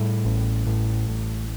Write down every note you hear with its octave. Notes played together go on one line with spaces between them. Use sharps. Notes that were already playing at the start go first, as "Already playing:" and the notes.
Already playing: A2 G3
A1
A2
A1